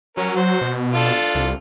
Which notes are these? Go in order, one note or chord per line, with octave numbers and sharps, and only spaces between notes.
F#3 C#4 A#4
F#4 C5
B2
D4 F4 A4
C2